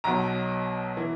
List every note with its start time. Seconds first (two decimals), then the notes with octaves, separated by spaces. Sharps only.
0.04 B1 B2 F#3 A#5
0.97 E3